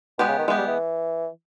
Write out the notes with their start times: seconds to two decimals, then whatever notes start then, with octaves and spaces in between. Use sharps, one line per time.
0.18 B2 G#3 B3 G4
0.28 C#3
0.39 D#3
0.48 E3 G#3 B3 G4
0.58 G3
0.67 E3